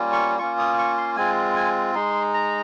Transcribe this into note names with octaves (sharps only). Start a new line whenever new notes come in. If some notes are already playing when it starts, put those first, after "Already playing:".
Already playing: G3 A#3 C#4 F4
C#6
A#3 C#4 F4 C#6
D#6
C#6
C6
G#3 C4 F4 G#5
G#5
G#3 D#4 C6
A#5